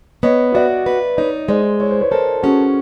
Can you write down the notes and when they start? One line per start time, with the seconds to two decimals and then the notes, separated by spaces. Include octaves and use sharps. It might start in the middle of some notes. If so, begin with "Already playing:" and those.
0.23 B3 C#5 D#5
0.54 F#4 D5 E5
0.86 B4
1.17 D#4 C#5 D#5
1.48 G#3 C5 D5
1.80 E4 C#5
1.91 C5
2.01 B4 C#5
2.11 A4 A#4 C5
2.43 C#4 F#4 G#4